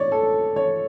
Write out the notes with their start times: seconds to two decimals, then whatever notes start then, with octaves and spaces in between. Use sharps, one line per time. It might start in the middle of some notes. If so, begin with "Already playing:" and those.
Already playing: C#5 D5
0.12 A4
0.56 C#5